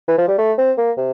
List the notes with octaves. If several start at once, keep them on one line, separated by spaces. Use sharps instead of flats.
E3
F3
G3
A3
C4
A#3
C3